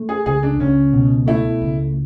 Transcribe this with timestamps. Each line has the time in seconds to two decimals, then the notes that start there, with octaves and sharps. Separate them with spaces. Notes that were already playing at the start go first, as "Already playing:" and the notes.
Already playing: A3
0.09 G#4
0.26 C#2 G#4
0.43 D4
0.60 C#2 C#4
0.93 B2
1.27 A3 E4
1.61 C#2